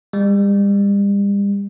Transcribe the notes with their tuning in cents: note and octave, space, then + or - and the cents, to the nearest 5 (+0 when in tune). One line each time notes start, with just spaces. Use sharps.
G3 +40